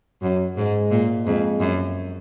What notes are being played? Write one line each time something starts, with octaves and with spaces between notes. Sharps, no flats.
F#2 F#3
G#2 G#3
A#2
F2 G#3
F#2